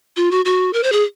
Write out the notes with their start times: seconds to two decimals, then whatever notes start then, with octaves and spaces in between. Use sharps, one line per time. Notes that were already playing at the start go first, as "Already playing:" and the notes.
0.17 F4
0.31 F#4
0.45 F#4
0.73 A#4
0.83 C5
0.92 G#4